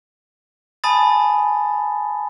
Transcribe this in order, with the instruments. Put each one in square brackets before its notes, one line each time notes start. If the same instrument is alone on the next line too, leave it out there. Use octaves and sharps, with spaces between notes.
[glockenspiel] G#5 A5 B5 D#6 A6